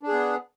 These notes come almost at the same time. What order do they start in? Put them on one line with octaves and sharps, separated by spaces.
D4 G#4 B3